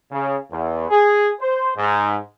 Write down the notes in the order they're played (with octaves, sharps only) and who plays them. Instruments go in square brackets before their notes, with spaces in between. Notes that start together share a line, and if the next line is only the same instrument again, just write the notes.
[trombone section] C#3
E2
G#4
C5
G#2